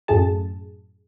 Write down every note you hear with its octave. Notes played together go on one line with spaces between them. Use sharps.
F#2 A2 A3 G#4 A5